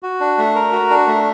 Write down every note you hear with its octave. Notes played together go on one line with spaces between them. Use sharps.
F#4
D4
A3
A#4
F#4
D4
A3